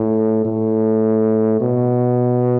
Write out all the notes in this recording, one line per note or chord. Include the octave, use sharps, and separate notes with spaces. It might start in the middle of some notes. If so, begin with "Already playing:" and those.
Already playing: A2
A2
B2